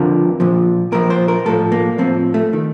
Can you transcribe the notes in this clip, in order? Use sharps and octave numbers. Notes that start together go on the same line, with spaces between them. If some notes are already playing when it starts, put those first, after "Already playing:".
Already playing: F2 D3 F3 A#4
A#2 F3
A#2 F3 A#4
C5
A#4
A2 F3 A4
A#3
A2 F3 C4
A3
D#3